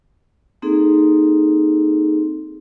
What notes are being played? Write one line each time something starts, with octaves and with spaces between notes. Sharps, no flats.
A#3 C4 D#4 G#4 A4